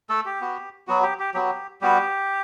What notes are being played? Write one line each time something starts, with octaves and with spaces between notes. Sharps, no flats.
A3 A4
G4
B3 F#4
F#3 B3 F#4
G4
G4
F#3 B3 F#4 G4
G3 B3 F#4 G4